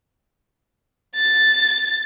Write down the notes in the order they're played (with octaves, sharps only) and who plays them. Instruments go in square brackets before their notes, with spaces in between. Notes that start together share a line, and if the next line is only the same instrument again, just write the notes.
[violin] A6